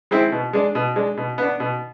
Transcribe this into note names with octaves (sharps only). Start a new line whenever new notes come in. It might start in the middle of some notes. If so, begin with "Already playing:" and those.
G#3 C4 E4
B2
G#3 D4
B2
G#3 D4
B2
B3 D4
B2